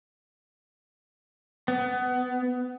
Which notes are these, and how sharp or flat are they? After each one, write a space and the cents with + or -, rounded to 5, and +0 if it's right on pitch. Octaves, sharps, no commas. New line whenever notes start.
B3 +20